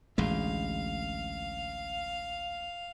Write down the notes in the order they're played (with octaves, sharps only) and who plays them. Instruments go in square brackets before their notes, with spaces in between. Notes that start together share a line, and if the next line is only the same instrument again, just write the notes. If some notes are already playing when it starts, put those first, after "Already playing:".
[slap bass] A1 D2 G#3 [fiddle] F5